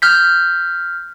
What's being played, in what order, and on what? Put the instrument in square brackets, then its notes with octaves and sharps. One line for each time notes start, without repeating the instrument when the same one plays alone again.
[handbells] F6 G6 B6